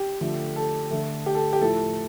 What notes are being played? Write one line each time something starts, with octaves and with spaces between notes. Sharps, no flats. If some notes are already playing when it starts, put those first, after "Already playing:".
Already playing: G4
D3 F3 A3
A4
D3 A3
G4
A4
G4
A2 F3 A3 A4